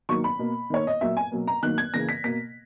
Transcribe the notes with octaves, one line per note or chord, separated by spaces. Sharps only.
D#3 F#3 A#3 C#6
B5
B2 A#3
D#3 A#3 C#5
D#5
A#2 F#3 A#3 E5
G#5
B2 F#3 A#3
A#5
D#3 F#3 A#3 F#6
G#6
C#3 E3 A#3 A#6
B6
B2 A#3 B6